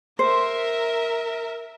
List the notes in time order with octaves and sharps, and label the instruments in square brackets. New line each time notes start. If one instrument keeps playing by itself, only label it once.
[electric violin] A#4 E5 [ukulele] C5